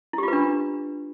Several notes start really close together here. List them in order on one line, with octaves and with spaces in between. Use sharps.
E4 G4 F4 B4 D4